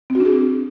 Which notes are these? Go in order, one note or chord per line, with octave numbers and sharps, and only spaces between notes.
C4
F#4
D4
G#4